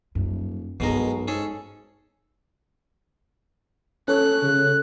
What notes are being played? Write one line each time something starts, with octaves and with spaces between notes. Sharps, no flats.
D#1 F#2
B1 G2 B2 G#3 E4 A#4
G#2 C#4 G#4 A4
C#4 A4 C#5 F#6
C#3